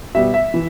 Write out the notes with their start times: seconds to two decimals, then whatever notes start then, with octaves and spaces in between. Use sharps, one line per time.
0.15 B2 G3 B3 E5
0.34 E5
0.54 E3